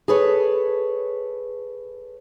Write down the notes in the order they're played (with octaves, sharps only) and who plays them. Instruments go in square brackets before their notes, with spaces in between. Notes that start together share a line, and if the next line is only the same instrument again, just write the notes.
[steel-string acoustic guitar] G#4 A4 B4 C#5